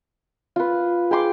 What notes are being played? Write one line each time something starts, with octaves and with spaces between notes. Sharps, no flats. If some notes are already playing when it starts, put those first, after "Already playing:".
F4 B4
G#4 G5 C6 D6